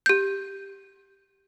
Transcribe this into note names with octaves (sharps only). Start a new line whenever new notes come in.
G4 G6